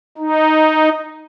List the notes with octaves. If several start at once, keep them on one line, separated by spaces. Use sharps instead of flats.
D#4